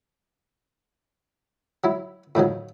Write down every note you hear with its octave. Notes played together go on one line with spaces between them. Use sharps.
F#3 E4
A2 D#3 F3 F#3